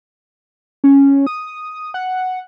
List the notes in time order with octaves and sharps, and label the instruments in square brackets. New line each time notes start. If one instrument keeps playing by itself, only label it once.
[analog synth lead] C#4
D#6
F#5